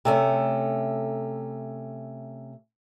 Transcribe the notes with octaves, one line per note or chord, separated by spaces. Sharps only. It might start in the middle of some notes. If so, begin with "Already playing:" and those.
C3 A3 C#4